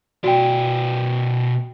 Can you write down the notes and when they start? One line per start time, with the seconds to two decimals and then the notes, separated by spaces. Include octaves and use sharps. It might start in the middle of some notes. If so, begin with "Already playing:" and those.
0.24 B2 F#4 D5 G5